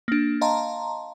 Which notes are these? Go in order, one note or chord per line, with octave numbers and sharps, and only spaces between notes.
A#3 D4
D#5 F5 A5 A#5 C6